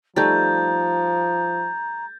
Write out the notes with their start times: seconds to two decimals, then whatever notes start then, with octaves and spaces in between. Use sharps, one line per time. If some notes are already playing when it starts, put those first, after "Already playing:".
0.16 F3 G3 A3 D#4 A#5 G6 A6